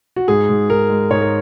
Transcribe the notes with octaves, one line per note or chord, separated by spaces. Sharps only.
F#4
G#2 G#4
G#2
G#2 A#4
G#3
G#2 C#5
A#4